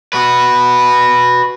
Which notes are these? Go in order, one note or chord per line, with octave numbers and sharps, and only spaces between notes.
F#4 B4